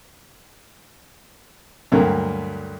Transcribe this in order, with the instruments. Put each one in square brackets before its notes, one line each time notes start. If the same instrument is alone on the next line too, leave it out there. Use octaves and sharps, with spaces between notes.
[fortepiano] D2 G2 D3 F#3 A#3